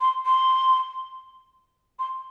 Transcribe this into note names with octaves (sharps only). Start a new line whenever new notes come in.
C6
C6
C6